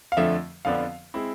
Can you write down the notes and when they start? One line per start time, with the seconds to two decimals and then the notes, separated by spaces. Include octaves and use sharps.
0.12 F5
0.17 F2 D3 F3 A3 E5
0.65 F2 D3 F3 B3 D4 F5
1.14 G#3 C4 E4